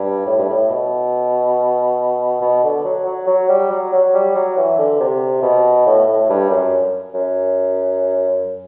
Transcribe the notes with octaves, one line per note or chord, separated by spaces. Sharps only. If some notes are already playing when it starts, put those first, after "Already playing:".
Already playing: G2
A2
G2
A2
B2
B2
D3
F#3
F#3
F#3
G3
F#3
F#3
G3
F#3
E3
D3
C3
B2
A2
A2
G2
F#2
F#2